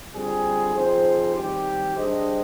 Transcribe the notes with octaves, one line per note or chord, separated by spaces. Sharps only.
D3 G3 C4 F4 G#4
F3 C4 D#4 G#4 C5
D#3 G3 C4 G4
G3 D4 G#4 C5 D#5